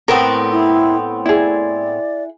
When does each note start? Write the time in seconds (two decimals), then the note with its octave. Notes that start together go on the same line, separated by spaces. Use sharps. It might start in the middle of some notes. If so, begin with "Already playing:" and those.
0.08 A2 B3 C4 A#4
0.51 E4
1.26 E4 G#4 D5